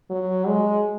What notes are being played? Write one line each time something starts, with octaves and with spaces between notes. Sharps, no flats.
F#3
G#3